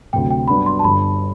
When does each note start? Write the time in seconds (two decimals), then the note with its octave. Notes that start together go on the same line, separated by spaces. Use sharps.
0.13 D2 C3 F#3 G5
0.31 G5
0.48 G2 F#3 B3 D4 B5
0.66 C6
0.79 A5
0.83 G1 G2 D3 B5